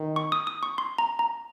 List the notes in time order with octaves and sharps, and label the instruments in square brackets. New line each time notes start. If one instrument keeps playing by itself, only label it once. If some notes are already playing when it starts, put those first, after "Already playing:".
Already playing: [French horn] D#3
[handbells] C#6
D#6
D#6
C#6
C6
A#5
A#5